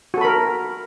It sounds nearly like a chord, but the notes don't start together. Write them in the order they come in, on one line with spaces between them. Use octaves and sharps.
F#4 A4 B5 A#4